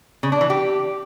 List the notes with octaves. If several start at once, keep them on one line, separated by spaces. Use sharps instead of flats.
C#3
D4
E3
G4